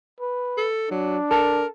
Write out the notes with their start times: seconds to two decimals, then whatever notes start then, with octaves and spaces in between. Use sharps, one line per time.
0.20 B4
0.57 A4
0.91 F#3 D4
1.31 A4 A#4